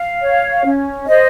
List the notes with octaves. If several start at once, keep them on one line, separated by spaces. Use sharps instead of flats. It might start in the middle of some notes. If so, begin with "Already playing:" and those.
Already playing: F5
C#5
C#4
C5 D#5